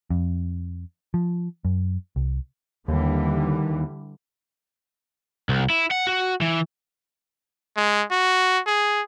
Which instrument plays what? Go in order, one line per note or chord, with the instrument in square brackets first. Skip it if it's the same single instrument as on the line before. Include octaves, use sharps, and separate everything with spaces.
[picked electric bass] F2
F3
F#2
C2
[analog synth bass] D#2 [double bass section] D3 E3 G3
[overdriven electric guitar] C2
E4
F#5
F#4
E3
[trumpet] G#3
F#4
G#4